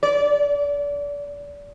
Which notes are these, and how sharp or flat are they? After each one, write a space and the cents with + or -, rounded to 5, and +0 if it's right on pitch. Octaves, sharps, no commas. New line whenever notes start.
D5 -30